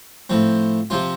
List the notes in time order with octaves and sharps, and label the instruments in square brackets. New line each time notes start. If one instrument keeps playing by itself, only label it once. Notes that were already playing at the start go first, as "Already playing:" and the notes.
[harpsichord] A2 F3 C4
C3 F3 C4 F4